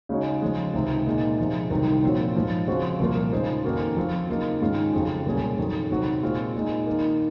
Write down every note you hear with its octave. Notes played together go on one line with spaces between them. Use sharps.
C#3 G#3 D#4 F#4 C#5
C#3 F3 G#3
C#2 C3 D#3
A#2 G#3 D#4
C3 F3 G#3
C2 C3 D#3 F#3
A#2 F3 C4 F#4 C#5
G#2 F3 C4
C#3 F3 C4 F#4 C5
C2 A#2 F3 A#3 F4
C#3 G#3 D#4 G#4 C5
F2 D#3 A#3 C#4 F#4
F3 C4 F4
C#3 F#3 A#3 D#4
G#2 D#3 G#3 C#4 F4
F2 C#3 F#3
C2 A#2 F#3 C#4 G#4
F2 D#3 F#3
C3 D#3 F#3 C4 F#4
A#2 G#3 C4 F4 G#4
A#2 G#3 D#4
D#3 A#3 D#4